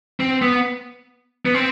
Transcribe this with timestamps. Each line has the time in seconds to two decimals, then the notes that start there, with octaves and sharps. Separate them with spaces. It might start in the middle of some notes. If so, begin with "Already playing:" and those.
0.20 C4
0.42 B3
1.46 B3
1.54 C4